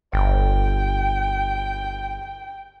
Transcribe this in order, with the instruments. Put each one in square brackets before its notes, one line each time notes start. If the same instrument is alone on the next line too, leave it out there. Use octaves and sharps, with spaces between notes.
[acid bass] G1 [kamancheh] G5